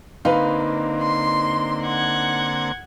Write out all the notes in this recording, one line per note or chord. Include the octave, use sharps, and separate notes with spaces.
D3 A#3 C4 D#4 B4 F5
C6
F#5 G#6